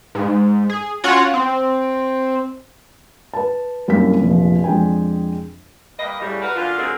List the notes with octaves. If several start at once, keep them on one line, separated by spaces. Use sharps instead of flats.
G#2
G#4
C#4 F4 F#4 C#5 F#5
C4
B4 A5
C2 F#2 A#3 C#4 D#4 B6
F1 A#1 F3
F2 G#3 D4 G5 G#5
G3 A#3 B4 D#5
F#2 A2 C#3 G3
F#4 A#4 B4
F#2 D3 F4
D3 F#3 G#3 C4 A#4